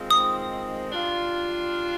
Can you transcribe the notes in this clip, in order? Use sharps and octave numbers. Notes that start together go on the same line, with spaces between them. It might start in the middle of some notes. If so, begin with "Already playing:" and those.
Already playing: G#2 D#3 G#3 C4 F4
D#6
G3 D4 F4